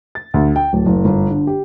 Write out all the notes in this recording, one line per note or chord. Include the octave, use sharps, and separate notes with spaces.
A6
D2
G5
D1
F#1
G1
D3
G4